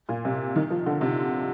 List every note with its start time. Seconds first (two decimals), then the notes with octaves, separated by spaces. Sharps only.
0.09 A#2
0.25 C3
0.56 D#3
0.70 F3
0.86 D3
1.01 C3